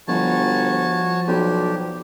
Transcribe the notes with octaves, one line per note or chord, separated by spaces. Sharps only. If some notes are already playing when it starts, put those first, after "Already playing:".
G1 F3 F#4 C#5 A5
B1 D4 G4